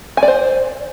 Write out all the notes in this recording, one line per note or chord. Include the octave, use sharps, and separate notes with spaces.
G#5
D5
C5